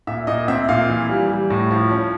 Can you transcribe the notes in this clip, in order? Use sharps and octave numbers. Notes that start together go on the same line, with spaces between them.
A#2 E5
A#2 D#5
C4 E5
A#2 F5
E3
G3
G3
A2
F3
C#4